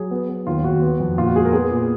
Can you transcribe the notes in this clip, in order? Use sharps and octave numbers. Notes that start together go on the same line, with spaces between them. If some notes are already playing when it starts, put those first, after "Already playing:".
Already playing: F#3 G#4
B3
B3
D#2 F4
D#2 F#4
B3
F2
A#2 F4
F#4
G#3 G#4
A#4
B3 G#4
A#2